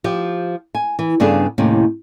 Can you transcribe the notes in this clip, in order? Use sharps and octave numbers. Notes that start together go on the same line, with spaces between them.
F3 G4
G#5
E3
G2 C#3 B3 D4 G#4 A4
D#2 A2 C3 C#4